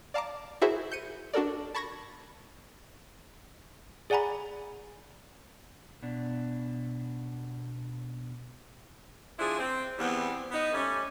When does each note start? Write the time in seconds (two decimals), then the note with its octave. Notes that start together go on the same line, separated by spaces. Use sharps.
0.14 D5 F5 A5 A#5 D6
0.62 E4 F#4 G#4 A#4 C5 E5
0.92 G6 C#7 D#7
1.33 D4 F#4 A4 A#4 D5
1.74 A5 B5 C#6 G#6 A#6
4.10 G#4 D5 F#5 G#5 A#5 B5
6.02 B2 D4
9.38 F3 D4 E4 G#4
9.58 C4
9.99 E2 G3 B3 C4
10.51 B3 D#4
10.73 G3 A3 C#4